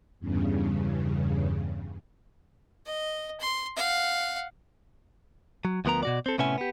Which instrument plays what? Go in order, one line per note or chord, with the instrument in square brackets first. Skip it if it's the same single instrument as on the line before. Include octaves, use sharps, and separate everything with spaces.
[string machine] E2 G2 C#3
[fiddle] D#5
C6
F5 F#5
[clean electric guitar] F#3
D2 F3 B3 A#4 A#5
B2 F#4 D5
C4 A4
A2 C3 B3 C#4 E5 G#5
B3 G4